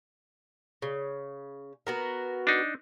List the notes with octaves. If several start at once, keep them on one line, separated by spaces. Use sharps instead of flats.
C#3
B3 F#4 A#4
D4 D#4